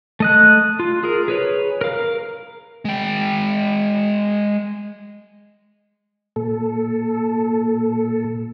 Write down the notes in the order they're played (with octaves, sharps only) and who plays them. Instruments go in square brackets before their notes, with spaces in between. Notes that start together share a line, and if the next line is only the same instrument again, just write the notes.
[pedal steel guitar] A3 D#5 F#6
F4
G#4 A#4
G#4 B4 C#5
A#4 F5
[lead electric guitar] G#3 G5
[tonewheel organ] A#2 A4